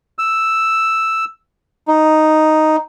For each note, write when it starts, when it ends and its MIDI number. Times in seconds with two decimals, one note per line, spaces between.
0.19 1.25 88
1.88 2.76 63